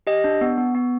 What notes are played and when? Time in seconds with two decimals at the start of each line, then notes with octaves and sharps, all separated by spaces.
0.07 G4 D#5
0.24 D4
0.41 B3
0.58 B3
0.75 B3